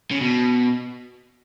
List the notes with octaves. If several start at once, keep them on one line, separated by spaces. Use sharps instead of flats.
C#3
B2